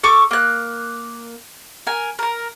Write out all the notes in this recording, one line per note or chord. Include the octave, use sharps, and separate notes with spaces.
A4 C#6 D6
A#3 F#6
A#4 G#5
A#4 A#5